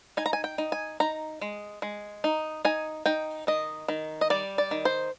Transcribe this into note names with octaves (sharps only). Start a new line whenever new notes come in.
D#4 G#5
A#5
G#5
G5
D#4
G#5
D#4 A#5
G#3
G#3
D#4
D#4 G#5
D#4 G5
D#3 D#5
D#3
D#5
G3 D5
D5
D#3
C5